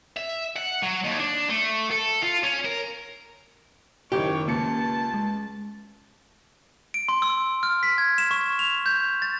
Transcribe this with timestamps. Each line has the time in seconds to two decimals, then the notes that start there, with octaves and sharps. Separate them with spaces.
0.16 E5
0.56 F#5
0.83 F#3
1.04 D#2
1.19 D4
1.49 A3
1.91 A4
2.23 F4
2.43 C#4
2.65 A#4
4.12 F#1 A2 D#3 G4 C#5
4.48 C#2 A#3 A5 C#7
5.14 G#3
6.94 D7
7.09 C6
7.22 E6
7.63 F6
7.83 B6
7.98 G#6
8.18 E7
8.31 C#6
8.59 F7
8.86 G6
9.22 A6